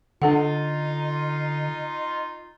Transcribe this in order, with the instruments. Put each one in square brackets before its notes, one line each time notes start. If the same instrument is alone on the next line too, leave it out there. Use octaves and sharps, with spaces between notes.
[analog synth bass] D3 [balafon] D4 A4 F#5 [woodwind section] D#4 F4